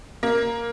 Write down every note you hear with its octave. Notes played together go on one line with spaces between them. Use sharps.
A#3